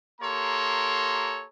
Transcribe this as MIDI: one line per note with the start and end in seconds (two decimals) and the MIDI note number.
0.21 1.45 58
0.21 1.45 67
0.21 1.45 69
0.21 1.45 73
0.21 1.45 82
0.21 1.45 84